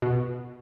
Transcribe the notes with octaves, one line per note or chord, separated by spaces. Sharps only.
B2